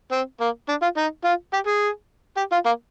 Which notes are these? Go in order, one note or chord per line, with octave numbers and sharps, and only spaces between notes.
C4
A#3
D4
F4
D#4
F4
G4
G#4
G4
F4
A#3